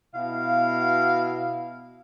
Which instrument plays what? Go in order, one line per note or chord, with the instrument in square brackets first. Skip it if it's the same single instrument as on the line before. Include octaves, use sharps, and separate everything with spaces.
[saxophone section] B2 E4 F5